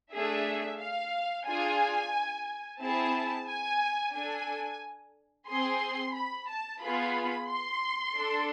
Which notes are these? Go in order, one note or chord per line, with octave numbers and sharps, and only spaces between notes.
A3 D4 G#4 E5
F5
D4 F4 G#4 G#5
C4 E4 G#4 A5
G#5
D4 A4 G#5
C4 G#4 C6
B5
A5
B3 F4 G#4 B5
C6
D4 A4